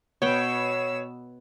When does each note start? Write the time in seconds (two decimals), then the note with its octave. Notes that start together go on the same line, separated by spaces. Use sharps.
0.22 B2 B3 C#5 G5 E6